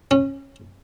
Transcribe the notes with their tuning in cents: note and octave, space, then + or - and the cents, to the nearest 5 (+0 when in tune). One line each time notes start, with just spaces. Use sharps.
C#4 -20